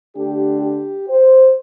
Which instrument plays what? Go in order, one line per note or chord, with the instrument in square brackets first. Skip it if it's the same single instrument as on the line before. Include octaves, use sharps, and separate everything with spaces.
[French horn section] D3 A3 D4 G4
G4
C5